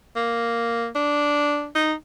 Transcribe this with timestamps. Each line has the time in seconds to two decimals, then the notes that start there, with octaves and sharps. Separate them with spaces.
0.16 A#3
0.95 D4
1.75 D#4